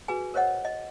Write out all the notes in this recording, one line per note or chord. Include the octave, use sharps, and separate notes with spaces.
F#4 G#4 B4 G#5
A#4 C5 C#5 D#5 F#5
D#5